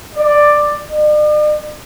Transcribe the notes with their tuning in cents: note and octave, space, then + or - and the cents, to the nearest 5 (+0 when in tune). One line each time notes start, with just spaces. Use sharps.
D5 +10
D5 +45